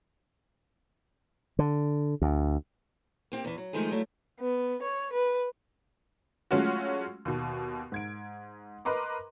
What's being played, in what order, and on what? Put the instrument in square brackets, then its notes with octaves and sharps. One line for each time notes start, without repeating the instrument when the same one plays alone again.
[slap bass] D3
D2
[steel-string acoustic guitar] A#3 C4 F#4 G4
E2 E3
F#3
D#3 F3 G#3 A3 D#4 G#4
F#3 G3 A3 E4 F4
[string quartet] B3
C#5
B4
[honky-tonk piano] F#3 G#3 A3 C#4 F4 F#4
D#2 B2
G#2 G#6 D7
A#4 B4 D#5 A#5 C6 D6